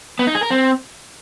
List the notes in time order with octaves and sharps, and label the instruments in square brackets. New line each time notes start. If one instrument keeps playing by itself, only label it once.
[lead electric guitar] B3
D#4
G#4
A#4
C4